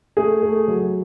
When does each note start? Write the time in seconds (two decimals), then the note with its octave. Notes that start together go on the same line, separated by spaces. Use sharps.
0.17 A3 G#4
0.42 A3
0.68 F#3